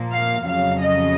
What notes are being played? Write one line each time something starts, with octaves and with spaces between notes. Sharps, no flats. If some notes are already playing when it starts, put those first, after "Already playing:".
Already playing: A#2 F3 A#3
F5
F2 C#3 F#3 F5
D#5